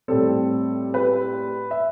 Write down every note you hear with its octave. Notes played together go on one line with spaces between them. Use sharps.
A2 G3 C4 A4
B4
E5